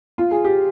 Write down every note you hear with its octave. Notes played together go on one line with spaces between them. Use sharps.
F4
G#4
G4